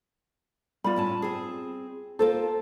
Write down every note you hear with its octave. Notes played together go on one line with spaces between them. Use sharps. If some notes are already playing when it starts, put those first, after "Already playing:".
G3 A3 B3 F4 B5
A2 C#4 A5
C4 G#4
A#3 F4 A4 C5